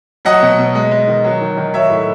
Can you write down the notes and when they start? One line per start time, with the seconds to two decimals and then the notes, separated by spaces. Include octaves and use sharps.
0.25 F#3 D#5 F#5
0.42 B2
0.58 B2
0.75 G#3
0.91 G#3
1.08 D#3
1.24 F#3
1.41 D#3
1.57 D#3
1.74 F#3 C#5 E5
1.90 A2